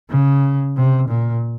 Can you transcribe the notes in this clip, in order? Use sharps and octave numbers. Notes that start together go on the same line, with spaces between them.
C#3
C3
A#2